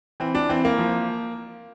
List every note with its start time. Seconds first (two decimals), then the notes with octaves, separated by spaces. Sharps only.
0.20 E3 C4
0.35 D4
0.49 E3 C4
0.65 A#3
0.79 F3